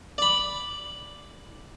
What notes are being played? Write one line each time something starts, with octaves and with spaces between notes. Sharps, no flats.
D5 B5